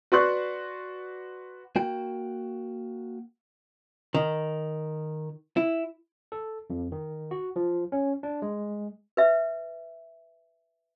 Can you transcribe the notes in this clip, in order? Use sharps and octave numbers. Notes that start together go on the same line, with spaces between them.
F#4 B4 D5 C6 C#6 F#6
A#3 F#4 G5
D#3
E4
A4
F2
D#3
F#4
F3
C#4
D4
G#3
B4 E5